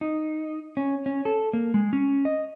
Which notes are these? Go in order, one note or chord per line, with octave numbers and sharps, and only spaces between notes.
D#4
C#4
C#4
A4
A#3
G#3
C#4
D#5